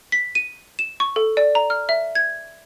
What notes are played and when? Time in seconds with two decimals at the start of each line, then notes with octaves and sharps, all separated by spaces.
0.12 B6
0.35 D#7
0.79 E7
1.00 C#6
1.16 A4
1.37 D5
1.55 A#5
1.70 F6
1.89 E5
2.15 G#6